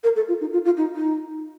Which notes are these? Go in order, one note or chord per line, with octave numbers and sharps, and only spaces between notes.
A#4
A4
F4
D#4
F4
F4
D#4
D#4